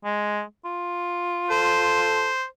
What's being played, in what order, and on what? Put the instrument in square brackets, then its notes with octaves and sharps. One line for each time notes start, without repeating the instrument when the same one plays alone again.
[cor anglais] G#3
F4
[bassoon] A4 [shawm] C5